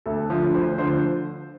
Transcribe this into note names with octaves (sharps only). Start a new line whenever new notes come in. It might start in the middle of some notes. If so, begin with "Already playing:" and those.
D2 A4
D3 F3
D2 C5
D3 F3 C5